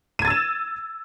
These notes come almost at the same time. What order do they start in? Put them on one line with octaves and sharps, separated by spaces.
D#7 G#6 A6 E6 E7